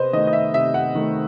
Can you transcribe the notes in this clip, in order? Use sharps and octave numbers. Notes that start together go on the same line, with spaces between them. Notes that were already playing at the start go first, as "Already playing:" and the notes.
Already playing: C3 B4 C5 D#5
D#3 A3 D#5
D#5
E5
C3 E5
F#5
D#3 A3